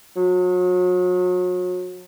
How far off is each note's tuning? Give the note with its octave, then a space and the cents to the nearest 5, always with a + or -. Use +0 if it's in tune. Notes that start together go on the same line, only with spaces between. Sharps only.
F#3 -40